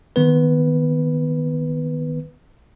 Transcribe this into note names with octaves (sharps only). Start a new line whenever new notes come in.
D#3 B3 B4